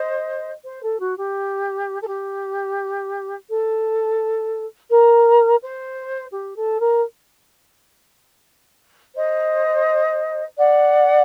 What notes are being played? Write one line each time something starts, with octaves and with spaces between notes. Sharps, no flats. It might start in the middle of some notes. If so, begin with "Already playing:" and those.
Already playing: C5 D#5
C5
A4
F#4
G4
A4
G4
A4
A#4
C5
G4
A4
A#4
C5 D#5
D5 F#5